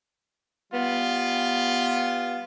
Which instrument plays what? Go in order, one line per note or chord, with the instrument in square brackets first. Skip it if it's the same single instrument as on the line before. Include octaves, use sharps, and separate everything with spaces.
[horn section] G3 B3 F4